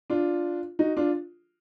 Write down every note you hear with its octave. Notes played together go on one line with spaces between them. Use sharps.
D4 F4
D#4 F#4
D4 F4